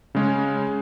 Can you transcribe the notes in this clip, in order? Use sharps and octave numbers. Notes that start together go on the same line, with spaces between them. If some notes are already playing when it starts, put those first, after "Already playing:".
C#3 G#3 C#4